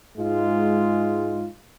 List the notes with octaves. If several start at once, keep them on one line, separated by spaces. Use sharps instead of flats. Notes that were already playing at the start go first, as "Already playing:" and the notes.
G#2 G#3 F4